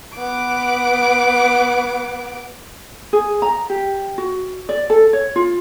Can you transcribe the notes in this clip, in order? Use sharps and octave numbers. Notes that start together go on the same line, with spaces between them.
B3 D6
G#4
A#5
G4
F#4
D5
A4
C#5
F4